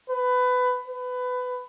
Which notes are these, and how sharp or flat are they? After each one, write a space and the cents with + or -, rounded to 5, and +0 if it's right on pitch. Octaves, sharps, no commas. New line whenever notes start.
B4 +20
B4 +20